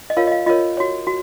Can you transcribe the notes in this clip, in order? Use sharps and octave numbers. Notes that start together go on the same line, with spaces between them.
D#5
F4 A#4 C#5 F5
D#5
F5
F4 A#4 C#5 D#5
F#4 C#5
F#4